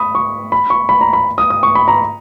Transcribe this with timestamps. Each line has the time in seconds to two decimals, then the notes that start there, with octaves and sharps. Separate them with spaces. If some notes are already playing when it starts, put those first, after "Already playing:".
Already playing: B5 D#6
0.15 C#6
0.52 B5
0.70 C#6
0.89 B5
1.01 A#5
1.13 B5
1.38 D#6
1.50 D#6
1.63 C#6
1.75 B5
1.88 A#5